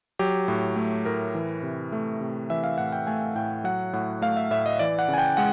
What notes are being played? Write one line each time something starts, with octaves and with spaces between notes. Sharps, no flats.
F#3 G4
A2
A3
A2 A#4
E3
C3
A3
C3
E3 E5
F5
A2 F#5
G5
A3 G#5
A2 G5
F#3 F#5
A2 F#5
A3 F5
E5
A2 E5
D#5
E3 D5
F#5
C#3
G#5
G5
G#3 F#5